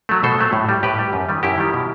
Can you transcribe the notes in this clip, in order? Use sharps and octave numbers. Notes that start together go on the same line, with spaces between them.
F#3 A3
B2 A4 C5
F#3 A3
A2
G3
A2 G4 B4
G3
F#2
D#3 G3
F#2 E4 G4
D#3 G3
B2